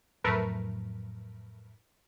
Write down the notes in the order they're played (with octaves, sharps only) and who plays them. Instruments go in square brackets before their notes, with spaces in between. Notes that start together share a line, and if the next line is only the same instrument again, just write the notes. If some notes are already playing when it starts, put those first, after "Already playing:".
[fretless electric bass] F2 A2 F#3 [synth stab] A3 A#4 B4